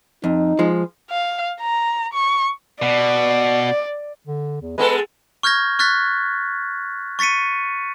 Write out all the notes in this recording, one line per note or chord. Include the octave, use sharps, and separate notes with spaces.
F2 D#4
F3 G#3
F5
A#5
C#6
B2 D5
D3
E2
G#3 B3 A4 B4
C#6 F6 G6 G#6 A#6
C#6 F6 F#6 A6 B6
C#6 A6 B6 C#7 D#7